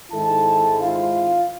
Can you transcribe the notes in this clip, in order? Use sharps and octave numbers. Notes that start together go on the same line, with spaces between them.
G#2 D#3 G#3 C4 E4 A4 A5
F4 F5